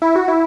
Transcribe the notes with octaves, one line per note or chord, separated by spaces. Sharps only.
E4
F#4
E4